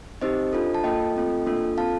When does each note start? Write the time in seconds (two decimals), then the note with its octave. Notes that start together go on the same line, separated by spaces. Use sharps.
0.21 C4 D#4 G4 C5 D#5
0.53 D4 F4 A4
0.75 A5
0.84 A#3 F4 A4 D#5 G5
1.15 A3 C4 F4 A4
1.46 A#3 D4 F4 A4
1.77 C4 F4 A4 F5 A5